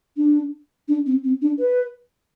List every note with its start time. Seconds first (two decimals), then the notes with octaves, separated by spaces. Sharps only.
0.16 D4
0.88 D4
1.06 C4
1.23 C4
1.41 D4
1.58 B4